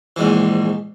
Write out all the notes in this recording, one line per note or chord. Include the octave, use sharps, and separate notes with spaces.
A#1 G#2 E3